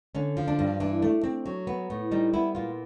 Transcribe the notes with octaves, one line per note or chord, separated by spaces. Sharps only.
D3 C#4
F3
D4
G2
E3 D4
A3
C4
F#3
B3
A2
G3 D#4
B3 E4
A#2 F4